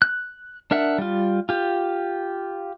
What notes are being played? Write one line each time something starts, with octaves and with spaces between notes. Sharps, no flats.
F#6
D4 A#4 E5 F#5
G3 F4
F4 G4